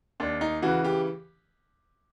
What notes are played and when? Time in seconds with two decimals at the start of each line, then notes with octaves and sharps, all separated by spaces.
0.20 D#2 D4
0.41 D#4
0.62 C#3 E3 F#4
0.84 G4